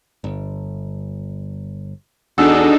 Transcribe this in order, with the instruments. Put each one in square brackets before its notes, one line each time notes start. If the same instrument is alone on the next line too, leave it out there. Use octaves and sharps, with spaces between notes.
[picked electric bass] G1
[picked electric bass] E2 [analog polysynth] D4 D#4 A4 [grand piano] F#4 G#4 E6